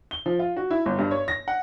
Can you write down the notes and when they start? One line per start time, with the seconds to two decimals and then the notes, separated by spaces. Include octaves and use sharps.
0.11 G7
0.26 F3
0.39 F4
0.57 F#4
0.70 E4
0.86 G1
0.99 G2
1.11 C#5
1.28 A#6
1.48 F#5